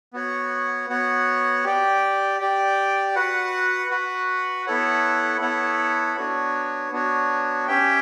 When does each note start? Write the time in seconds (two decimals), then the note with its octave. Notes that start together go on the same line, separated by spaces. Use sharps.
0.13 B3 F#4 C#5 F#5
0.89 B3 F#4 C#5 F#5
1.64 G4 D5 G5
2.40 G4 D5 G5
3.15 F#4 B4 F#5
3.91 F#4 B4 F#5
4.66 B3 E4 A4 C#5 F#5
5.41 B3 E4 A4 C#5 F#5
6.16 B3 D4 F#4 C#5
6.92 B3 D4 F#4 C#5
7.67 C#4 G4 C#5 E5 G5